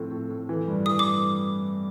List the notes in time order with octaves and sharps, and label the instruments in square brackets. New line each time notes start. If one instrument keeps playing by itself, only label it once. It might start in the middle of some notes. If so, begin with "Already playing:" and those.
Already playing: [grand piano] A2 F3 C4
A2
A2
E3
G2
[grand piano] E3 [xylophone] D#6
[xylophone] D6